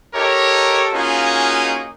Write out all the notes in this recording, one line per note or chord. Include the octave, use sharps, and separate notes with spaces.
D#4 G4 A4 A#4 C#5
A#3 C#4 D#4 F4 F#4 G#4